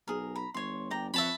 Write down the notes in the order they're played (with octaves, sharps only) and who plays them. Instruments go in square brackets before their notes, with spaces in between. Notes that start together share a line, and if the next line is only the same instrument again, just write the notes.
[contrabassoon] B1 [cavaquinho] G#4 A#4
[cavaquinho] A#5 B5
[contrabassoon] G1 [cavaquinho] C#5 C6
[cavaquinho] D5 G5 A#5
[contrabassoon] F2 [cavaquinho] B4 C#5 [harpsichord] E5 A5 B5